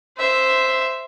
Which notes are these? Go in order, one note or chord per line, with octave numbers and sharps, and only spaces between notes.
C5 E5